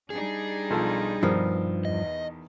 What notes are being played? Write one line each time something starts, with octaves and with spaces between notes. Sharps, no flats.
G3 D4 D#4 G#4
B1 F3 A4
G2 B2 D#3 F3
E2 D#5